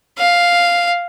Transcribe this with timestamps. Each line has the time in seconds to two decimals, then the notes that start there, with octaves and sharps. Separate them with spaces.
0.18 F5